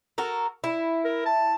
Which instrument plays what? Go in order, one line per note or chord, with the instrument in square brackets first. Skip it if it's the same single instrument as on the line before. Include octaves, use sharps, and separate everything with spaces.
[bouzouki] F#4 A4 A#4
E4
[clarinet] A#4
A5